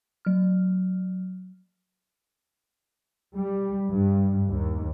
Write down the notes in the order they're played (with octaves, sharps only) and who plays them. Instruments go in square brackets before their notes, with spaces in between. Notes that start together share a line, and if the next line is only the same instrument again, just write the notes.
[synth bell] F#3 F6
[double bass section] G3
G2
D#2